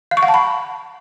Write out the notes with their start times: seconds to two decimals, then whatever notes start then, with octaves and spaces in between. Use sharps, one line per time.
0.11 F5
0.17 C#6
0.23 F#5
0.28 A5
0.34 B5